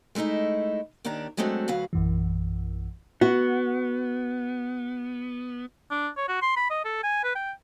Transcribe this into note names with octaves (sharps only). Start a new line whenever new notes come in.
G#3 A3 C#4 D#4 E4
D#2 D#3 D4 G4 A#5
F#3 G#3 A3 C4 D4 F#4
D2 F#3 F#4 B4 F5
A#1 F#2 E3
B3 F#4
D4
C#5
F#4
C6
B5
D#5
A4
G#5
B4
G5